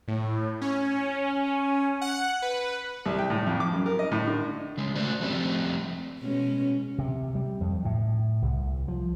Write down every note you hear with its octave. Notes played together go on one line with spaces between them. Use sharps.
A2
C#4
F#5
B4
C2
G5
A2
F2
D6
F#2
A#4
D#5
A2
D3
C#3 G#3
A3 F#4 C5 D5
F3 G3 A3 C4 D4
B2 G#3 C#4
C3
G3
F2
A2
C2
F3